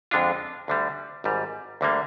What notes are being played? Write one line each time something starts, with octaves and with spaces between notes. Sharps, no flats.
F2 D3 G#3 D4 F4
D2 D3 G3
G#1 G#2 G3
D2 D3 G3 A#3